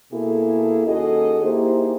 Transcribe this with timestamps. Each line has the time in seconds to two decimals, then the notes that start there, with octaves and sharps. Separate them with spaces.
0.12 B2 A#3 E4 G#4 A4
0.87 D#2 C#4 F#4 G#4 A4 D#5
1.43 A#3 D#4 E4 G4 G#4 C5